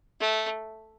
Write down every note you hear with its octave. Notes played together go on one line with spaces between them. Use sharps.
A3